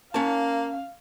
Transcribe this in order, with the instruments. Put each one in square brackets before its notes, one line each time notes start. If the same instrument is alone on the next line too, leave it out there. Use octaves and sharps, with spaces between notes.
[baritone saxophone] A#3 [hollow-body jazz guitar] C#4 A5 [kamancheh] F5